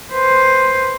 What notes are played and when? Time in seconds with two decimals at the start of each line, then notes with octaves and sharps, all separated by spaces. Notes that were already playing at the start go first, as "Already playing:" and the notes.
0.12 B4 C5